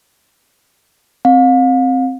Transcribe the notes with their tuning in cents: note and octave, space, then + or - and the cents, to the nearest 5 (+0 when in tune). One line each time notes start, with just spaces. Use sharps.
C4 +0 F5 +35